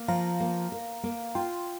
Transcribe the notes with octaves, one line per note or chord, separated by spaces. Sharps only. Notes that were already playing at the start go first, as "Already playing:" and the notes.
Already playing: A#3
F3 F5 A#5
A#3
A#4
A#3
F4 G5 C6